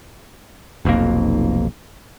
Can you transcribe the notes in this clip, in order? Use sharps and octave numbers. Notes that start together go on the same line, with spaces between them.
F1 B1 F2 A#3